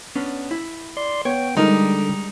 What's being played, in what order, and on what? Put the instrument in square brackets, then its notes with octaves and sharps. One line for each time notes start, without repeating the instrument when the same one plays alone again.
[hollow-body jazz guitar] B3 C#4 D4
E4
[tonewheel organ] D5 C6
[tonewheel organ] B3 G5 [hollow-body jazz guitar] C#5
[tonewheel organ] D3 [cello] G3 [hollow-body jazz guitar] G#3 D4 A#4 [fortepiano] D#4